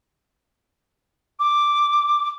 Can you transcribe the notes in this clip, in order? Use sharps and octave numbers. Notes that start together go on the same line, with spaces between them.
D6